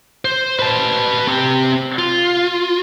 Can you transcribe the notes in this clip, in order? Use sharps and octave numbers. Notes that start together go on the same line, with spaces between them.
C5
B4 A5
C4 G4
F4